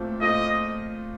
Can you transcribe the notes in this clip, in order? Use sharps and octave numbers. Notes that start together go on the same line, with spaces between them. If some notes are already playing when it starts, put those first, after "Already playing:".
Already playing: A#2 A3 C4 F4 A4
A#2 A3 C4 F4 A4 D#5